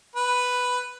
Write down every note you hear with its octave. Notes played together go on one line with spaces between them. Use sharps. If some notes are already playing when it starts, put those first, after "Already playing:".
B4